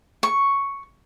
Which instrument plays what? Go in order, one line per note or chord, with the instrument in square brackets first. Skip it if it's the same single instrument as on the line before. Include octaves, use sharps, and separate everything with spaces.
[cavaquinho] C#6